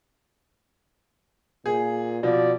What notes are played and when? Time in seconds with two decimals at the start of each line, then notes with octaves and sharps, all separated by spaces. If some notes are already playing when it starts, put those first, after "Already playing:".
1.66 A#2 G#4
2.23 B2 F3 D5